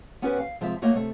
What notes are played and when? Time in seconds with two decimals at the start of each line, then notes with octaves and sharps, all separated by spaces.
0.22 B3 C#4 F#4 G4 B4 C5
0.38 F5
0.61 C3 F3 G#3 E5
0.82 A3 A#3 F#4 C#5 D#5
0.95 C3 A3